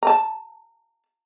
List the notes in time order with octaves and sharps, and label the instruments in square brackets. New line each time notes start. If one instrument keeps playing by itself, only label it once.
[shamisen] A5 A#5